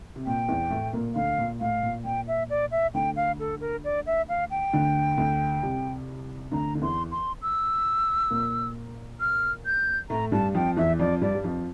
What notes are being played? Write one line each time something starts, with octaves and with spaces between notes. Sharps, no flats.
C3
A#2 G5
E2 E3
A2 A3
A#2 A#3
D2 D3 F5
A#2
A2 F5
A#2
A#2 G5
E5
D5
E5
D2 D3 G5
F5
A4
A#4
D5
E5
F5
G5
D2 D3
D2 D3
C2 C3
D2 D3 A#5
D3
E2 E3 C6
C6
E6
A#2 A#3
F6
G6
A2 A3 A#5
G2 G3 A5
F2 F3 G5
E2 E3 E5
F2 F3 D5
G2 G3 D5
G3
F2 F3